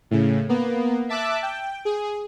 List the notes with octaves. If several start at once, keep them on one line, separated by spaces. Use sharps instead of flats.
A2 C#3
A#3 B3
E5 A5 D6 E6 F#6
G5
G#4